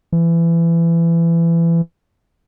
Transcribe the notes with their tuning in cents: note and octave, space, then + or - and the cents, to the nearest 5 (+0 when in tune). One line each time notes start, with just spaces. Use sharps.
E3 +25